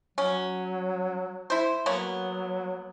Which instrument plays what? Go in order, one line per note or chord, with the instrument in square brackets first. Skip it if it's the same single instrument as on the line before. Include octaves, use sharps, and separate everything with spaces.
[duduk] F#3 [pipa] C#4
[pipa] E4 C5
[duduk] F#3 [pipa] A#3 B3 C#5